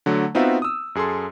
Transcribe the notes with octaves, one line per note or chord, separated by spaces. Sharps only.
D3 F#3 A3
B3 C4 D#4 F4 F#4 E5
D#6 E6
F#2 G#4 A4 C6